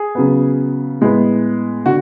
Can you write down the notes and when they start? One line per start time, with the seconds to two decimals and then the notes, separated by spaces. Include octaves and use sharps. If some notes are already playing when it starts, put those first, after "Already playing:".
Already playing: G#4
0.15 C#3 F#3 B3
1.01 A2 G#3 B3
1.86 D3 F#4